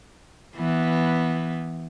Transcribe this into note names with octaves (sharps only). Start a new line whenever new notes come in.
E3 B3